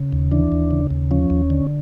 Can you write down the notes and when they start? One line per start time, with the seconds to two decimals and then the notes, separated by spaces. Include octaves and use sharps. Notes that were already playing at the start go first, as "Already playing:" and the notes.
Already playing: C#3
0.13 D#2
0.32 E3 D4
0.52 D#2
0.71 C#3
0.91 D#2
1.11 F3 C#4
1.30 D#2
1.50 D3